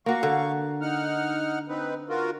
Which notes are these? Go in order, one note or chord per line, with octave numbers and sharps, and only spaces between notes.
A#3 F#4 F5 C#6
D3
D#4 F#5 F6
C4 D#4 B4
F4 F#4 A#4